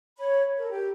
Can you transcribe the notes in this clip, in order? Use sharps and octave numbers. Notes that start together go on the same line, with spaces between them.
C#5 B5
A4 A#4
G4